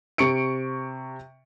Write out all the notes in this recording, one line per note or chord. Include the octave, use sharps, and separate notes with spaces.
C3 C#6 C#7 D7